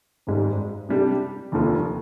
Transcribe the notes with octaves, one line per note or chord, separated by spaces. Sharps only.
G#1 G#2 G3
C3 G3 D4 G4
F1 D#2 D3 F3